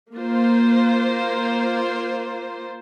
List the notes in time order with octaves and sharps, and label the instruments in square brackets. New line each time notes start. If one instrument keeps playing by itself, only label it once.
[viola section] A#3 F4 C5